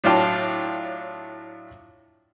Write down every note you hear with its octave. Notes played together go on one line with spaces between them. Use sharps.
A2 F#3 D4 F4 G5 A5